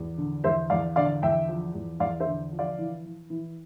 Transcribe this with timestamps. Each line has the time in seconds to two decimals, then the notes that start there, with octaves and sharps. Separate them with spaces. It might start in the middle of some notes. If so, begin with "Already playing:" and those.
Already playing: E2
0.18 D3
0.44 E2 C5 E5
0.70 E2 D5 F5
0.96 D3 D5 F5
1.22 E2 E5 G5
1.48 F3
1.74 E2
2.00 E2 D5 F5
2.20 C5 E5
2.26 D3
2.52 F3
2.59 D5 F5
2.78 E3
3.05 E3
3.30 E3